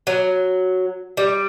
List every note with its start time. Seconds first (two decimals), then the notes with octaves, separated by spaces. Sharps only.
0.07 F#3
1.17 G3